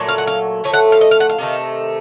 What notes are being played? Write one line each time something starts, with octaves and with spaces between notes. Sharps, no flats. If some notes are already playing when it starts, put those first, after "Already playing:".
Already playing: A#2 F#3 A3
F5
F#5
F5
A2 F3 A3 C#5
F#5
F5
D#5
F5
F#5
F5
C3 D#3 A3